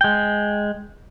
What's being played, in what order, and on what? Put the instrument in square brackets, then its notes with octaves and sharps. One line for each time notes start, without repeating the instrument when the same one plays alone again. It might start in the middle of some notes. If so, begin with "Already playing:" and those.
[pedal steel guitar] G#3 G5